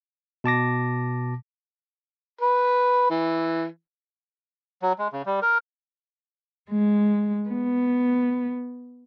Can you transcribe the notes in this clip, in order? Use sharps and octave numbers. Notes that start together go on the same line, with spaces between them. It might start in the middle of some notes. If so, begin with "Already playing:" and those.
B2 A5 D6 A#6
B4
E3
F#3
G#3
C#3
G3
A#4
G#3
B3